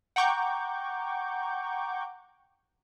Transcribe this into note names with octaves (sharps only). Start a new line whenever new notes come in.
F#5 G5 A#5 C#6 D6 G6